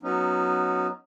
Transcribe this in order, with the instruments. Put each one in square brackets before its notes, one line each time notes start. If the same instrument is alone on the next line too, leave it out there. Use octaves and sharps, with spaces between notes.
[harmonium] F#3 B3 C#4 D#4